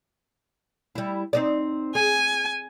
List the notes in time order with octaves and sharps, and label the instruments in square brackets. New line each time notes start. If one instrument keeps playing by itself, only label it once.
[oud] G3 E4
C4 D#4 D5
[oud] G#4 [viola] G#5